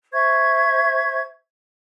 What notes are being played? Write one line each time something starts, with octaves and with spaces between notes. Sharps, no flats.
C5 E5 C#6 G#6